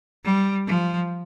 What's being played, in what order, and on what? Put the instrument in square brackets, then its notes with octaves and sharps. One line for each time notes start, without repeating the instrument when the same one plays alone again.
[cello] G3
F3